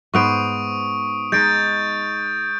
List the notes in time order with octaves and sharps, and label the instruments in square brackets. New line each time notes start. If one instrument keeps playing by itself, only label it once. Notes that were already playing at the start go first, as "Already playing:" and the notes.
[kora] G#2 B3 C5 [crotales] C#6 D#6 D7
[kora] G#3 D#4 [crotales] G6 A6 D7